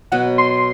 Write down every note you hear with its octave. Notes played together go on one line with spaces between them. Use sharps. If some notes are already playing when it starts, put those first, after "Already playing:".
B2 F#3 B3 F#5
C6